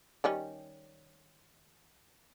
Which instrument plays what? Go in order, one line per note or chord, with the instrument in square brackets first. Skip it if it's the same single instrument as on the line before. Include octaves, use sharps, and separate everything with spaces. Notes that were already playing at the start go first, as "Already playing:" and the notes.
[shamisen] D#3 G3 C#4